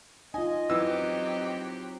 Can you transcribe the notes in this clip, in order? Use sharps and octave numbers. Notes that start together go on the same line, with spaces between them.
D#4 F4 D#5 G#5
F#2 E3 F#3 C4 G4 E6